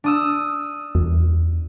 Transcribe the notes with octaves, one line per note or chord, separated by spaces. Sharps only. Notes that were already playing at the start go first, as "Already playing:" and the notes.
D4 D#6 E6
E2